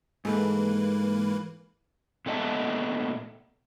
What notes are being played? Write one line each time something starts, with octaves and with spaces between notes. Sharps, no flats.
G#2 E3 A3 A#3 B4
A#2 A3 B3 D#5 E5 A5